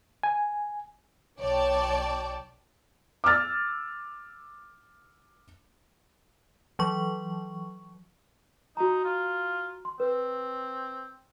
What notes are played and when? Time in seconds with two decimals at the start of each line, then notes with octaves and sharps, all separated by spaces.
0.23 G#5
1.40 B1 C#5 D5 G5 A5 D6
3.24 D6 E6 F6 A6
6.79 E3 F#3 C#6
8.77 D#4 F#4 A#5
9.04 F4
9.85 C6
10.00 C4 B4